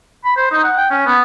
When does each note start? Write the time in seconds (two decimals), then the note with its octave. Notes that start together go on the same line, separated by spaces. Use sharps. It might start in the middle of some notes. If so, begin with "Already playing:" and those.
0.25 B5
0.37 C5
0.51 D#4
0.64 F#5
0.77 G5
0.90 C#4
1.06 B3